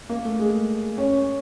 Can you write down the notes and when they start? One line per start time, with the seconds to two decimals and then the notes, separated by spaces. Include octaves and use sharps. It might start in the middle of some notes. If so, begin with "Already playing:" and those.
0.09 A#3
0.25 A3
0.39 G#3
0.98 C#4